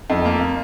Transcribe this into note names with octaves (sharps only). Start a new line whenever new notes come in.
F2
A#3